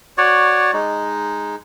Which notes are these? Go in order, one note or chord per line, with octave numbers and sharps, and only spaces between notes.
F#4 C#5 D5
G#3 D#4